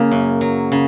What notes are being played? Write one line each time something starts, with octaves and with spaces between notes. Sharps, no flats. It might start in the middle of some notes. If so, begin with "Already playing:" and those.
Already playing: C#3 A#3
F#2
F#3
C#3